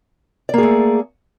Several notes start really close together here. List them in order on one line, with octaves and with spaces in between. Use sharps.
D5 A#3 G#4 A3